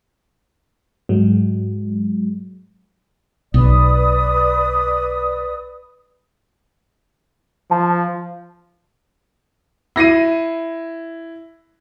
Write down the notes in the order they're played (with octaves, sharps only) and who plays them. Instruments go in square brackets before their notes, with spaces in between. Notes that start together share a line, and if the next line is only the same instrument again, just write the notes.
[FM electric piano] G#2 F#3 G#3
[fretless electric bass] B1 [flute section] B4 D5 D#6
[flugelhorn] F3 [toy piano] A5
[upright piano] E4 A#6 C7 D#7